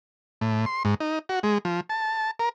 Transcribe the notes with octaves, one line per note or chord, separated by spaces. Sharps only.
A2
C6
G#2
D#4
F#4
G#3
F3
A5
A#4